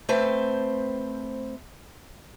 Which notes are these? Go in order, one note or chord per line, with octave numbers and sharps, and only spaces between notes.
A3 C4 B4 C5